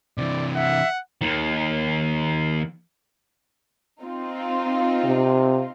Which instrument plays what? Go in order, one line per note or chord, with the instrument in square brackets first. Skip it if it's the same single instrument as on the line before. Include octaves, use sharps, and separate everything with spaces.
[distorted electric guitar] C3 E3 [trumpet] D5
[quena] E5 [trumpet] F#5
[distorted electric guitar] D#2 D#3
[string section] C4 D#4 F4
[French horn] C3